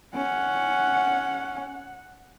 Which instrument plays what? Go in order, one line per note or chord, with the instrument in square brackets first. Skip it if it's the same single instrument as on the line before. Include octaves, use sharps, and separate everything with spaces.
[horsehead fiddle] C#4 [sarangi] F#5